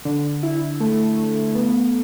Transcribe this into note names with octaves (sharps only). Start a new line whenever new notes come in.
D3
E4
A3
A3
B3